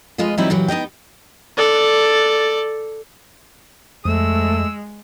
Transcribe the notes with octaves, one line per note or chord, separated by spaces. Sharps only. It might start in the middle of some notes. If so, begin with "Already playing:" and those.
F2 G#3 F4 B4 D#5
E3 F#3 G3 C4 D#4 E4
A#2 E3 F#3 G4
B3 D#4 D#5 G5
A4 D5
F2 G#3 A3 E6